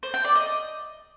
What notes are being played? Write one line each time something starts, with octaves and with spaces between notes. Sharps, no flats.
C5
G5
D5
D#5